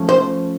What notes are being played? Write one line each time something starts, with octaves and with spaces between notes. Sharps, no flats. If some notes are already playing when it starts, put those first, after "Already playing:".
Already playing: F3 A3 C#4
C5